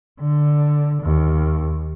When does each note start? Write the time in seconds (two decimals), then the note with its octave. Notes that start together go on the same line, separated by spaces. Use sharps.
0.21 D3
1.03 D#2